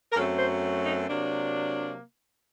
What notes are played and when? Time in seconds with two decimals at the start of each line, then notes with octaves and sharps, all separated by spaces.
0.12 A#4
0.15 F#2 F#3 A3 C4 A4
0.39 C5
0.84 D#4
1.08 C3 F#3 A#3 D4